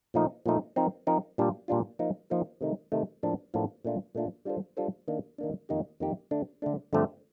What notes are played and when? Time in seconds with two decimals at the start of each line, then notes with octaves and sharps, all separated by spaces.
0.14 A#2 F3 A3 D#4
0.46 A#2 F3 A3 D#4
0.76 F3 C4 D#4 A#4
1.07 F3 C4 D#4 A#4
1.38 A#2 G3 D4 F4
1.68 A#2 G3 D4 F4
1.99 F3 A#3 D#4 A#4
2.30 F3 A#3 D#4 A#4
2.61 C3 D#3 A3 D#4
2.92 C3 D#3 A3 D#4
3.23 A2 F3 A#3 D4 A4
3.54 A2 F3 A#3 D4 A4
3.85 A#2 A3 D4 F4
4.15 A#2 A3 D4 F4
4.45 G3 D4 F4 A4 C5
4.77 G3 D4 F4 A4 C5
5.08 D#3 A#3 D4
5.38 D#3 A#3 D4
5.69 F2 D#3 A#3 D#4 G4
6.00 F2 D#3 A#3 D#4 G4
6.31 D3 A3 D4
6.62 D3 A3 D4
6.93 G2 D3 F3 A3 C4